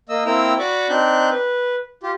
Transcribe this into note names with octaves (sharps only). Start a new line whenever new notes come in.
A#3 D#5 E6
A#3 C4 E4 G5 A#5 E6
F#4 D5 B5 C#6 D6
C4 D4 D#4 F#6 G6
B4
F4 G4